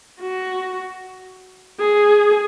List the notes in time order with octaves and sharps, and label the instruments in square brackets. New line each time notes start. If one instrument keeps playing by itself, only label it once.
[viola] F#4
G#4